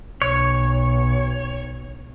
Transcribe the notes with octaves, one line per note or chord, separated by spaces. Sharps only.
B1 C#5